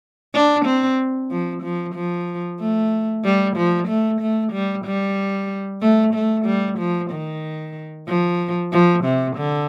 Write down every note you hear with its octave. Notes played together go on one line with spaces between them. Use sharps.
D4
C4
F3
F3
F3
A3
G3
F3
A3
A3
G3
G3
A3
A3
G3
F3
D#3
F3
F3
C3
D3